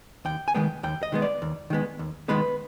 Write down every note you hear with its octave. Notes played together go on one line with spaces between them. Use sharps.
D#2 G5
G#5
D#3 G#3 B3 G5
D#2 G5
D#5
D#3 G#3 B3
D5
D#2
D#3 G#3 B3
D#2
D#3 G#3 B3 B4